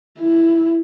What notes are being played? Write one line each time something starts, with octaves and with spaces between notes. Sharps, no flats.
E4